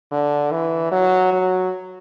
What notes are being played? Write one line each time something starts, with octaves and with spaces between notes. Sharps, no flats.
D3
E3
F#3
F#3